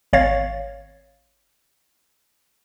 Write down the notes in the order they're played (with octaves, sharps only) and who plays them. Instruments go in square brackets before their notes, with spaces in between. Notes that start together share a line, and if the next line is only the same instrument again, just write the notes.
[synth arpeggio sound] G#1 C#5 F5 A6